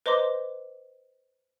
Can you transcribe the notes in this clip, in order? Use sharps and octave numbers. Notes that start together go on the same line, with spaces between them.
B4 C5 D#5 A#5 C6 D6